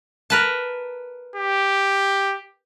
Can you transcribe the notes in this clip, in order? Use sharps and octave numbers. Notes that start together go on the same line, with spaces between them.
A#4 B4 A5
G4